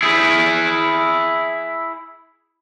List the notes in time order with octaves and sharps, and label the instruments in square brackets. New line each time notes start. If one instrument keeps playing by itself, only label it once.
[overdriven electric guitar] E4 G#4